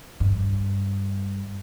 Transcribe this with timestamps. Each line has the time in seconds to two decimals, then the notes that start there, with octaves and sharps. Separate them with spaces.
0.20 G2